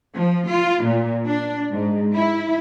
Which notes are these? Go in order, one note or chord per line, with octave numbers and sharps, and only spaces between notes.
F3
F4
A#2
D4
G#2
E4